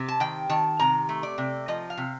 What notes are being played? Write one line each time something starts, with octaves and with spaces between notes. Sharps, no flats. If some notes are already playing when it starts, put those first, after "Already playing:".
Already playing: C3
A5
D#3 G5
D#3 A5
C3 A#5
A3
D5
C3
F3 D#5
F5
C3